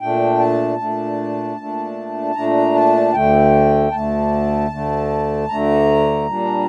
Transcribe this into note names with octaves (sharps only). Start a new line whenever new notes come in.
A#2 A3 D4 G5
A5
A#2 A3 D4
A#2 A3 D4
A#2 A3 D4 A#5
A5
D2 D3 A3 G5
D2 D3 A3 A5
D2 D3 A3
D2 D3 A3 A#5
A#2 G3 D4